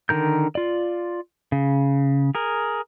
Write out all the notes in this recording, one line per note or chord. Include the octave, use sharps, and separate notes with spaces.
D3 D#3 A#4 G6
F4 D5
C#3
G#4 A#4